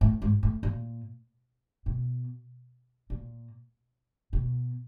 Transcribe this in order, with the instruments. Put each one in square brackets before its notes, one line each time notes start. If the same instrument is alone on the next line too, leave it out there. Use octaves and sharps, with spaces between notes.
[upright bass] A2
G#2
A2
A#2
B2
A#2
B2